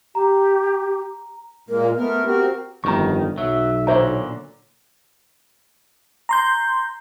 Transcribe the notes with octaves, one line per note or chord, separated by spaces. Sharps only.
G4 A#5
A#2 G#3 A#3 A#4
A3 B3 A#4
C4 F#4 G4 A#4
G1 F2 D#3 A#5 C#6
B1 F#3 E5
A#2 D3 C5 C#5 E5 A#5
A#5 C6 G6